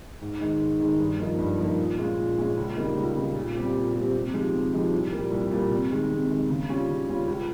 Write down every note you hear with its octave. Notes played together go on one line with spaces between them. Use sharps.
G#2
D#3 G#3 D#4
G#2
D#3 G#3 D#4
G2
F3 A#3 D#4
G2
F3 A#3 D#4
A#2
G#3 C#4 F4
A#2
G#3 C#4 F4
C#2
C#3 G3 A#3 D#4
C#2
C#3 G3 A#3 D#4
A#2
G3 C4 G4
A#2
G3 C4 G4
C3
F3 G#3 D#4 G4
C3
F3 G#3 D#4 G4
C2
A#2 G3 A#3
C2
A#2 G3 A#3
C3
D#3 G#3
C3
D#3 G#3
C#3
G3 C#4 F4
C#3
G3 C#4 F4
C#2